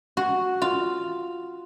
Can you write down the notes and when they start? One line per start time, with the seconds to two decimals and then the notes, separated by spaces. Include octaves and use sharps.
0.17 F#4
0.62 F4